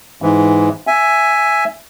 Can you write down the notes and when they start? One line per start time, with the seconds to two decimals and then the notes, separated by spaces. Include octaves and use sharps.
0.22 G#2 E3
0.87 E5 G#5